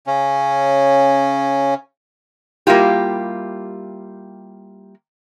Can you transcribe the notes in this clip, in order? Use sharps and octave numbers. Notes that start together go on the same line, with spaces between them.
C#3 C#4
G3 A#3 E4 F4 G4